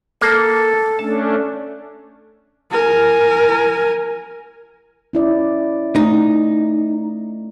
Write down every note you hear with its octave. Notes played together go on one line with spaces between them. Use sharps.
A#3 A4
A3 C#4 D4 A5
A#4 G#5
C#4 E4 D5
A3 D#4